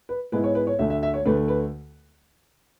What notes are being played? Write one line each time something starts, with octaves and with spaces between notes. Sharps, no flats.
B4
G#2 G#3 B3 E4 B4
C#5
B4
C#5
D2 D3 A3 E5
E5
E5
C#5
D2 D3 A3 B4
B4